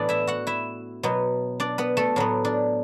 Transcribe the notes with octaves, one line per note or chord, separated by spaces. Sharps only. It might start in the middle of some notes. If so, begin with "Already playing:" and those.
Already playing: A2 E3 B3 D4 D5
E4 E5
F#4 F#5
E4 E5
B2 F#3 B3
D4 D5
B3 B4
A3 A4
A2 F#3 B3
D4